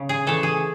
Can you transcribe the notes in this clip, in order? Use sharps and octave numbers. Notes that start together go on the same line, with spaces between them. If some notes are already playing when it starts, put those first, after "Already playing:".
Already playing: C#3
G#4
E3 A3 A4
G#4